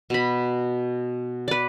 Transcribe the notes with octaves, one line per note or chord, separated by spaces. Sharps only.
B2 B5
B4 D5